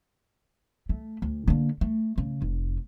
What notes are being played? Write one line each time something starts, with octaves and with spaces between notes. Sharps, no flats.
A3
D2
D3 A#3
A3
C#3
F1